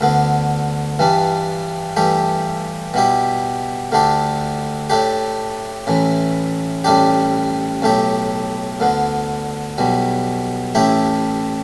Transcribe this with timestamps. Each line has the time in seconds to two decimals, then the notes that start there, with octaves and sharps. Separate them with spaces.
0.01 D2 D3 B3
0.99 G2 E3 G3 D4
1.97 G2 E3 A3 G4
2.94 B2 G3 E4 G4
3.92 D2 D3 A3 D4 G4
4.90 A2 A3 D4 G4
5.87 A1 A2 E3
6.84 A1 A2 G3 D4 G4
7.82 B1 A2 A3 G4
8.80 D2 D3 B3
9.78 B1 B2 G3
10.75 A1 A2 A3 E4 G4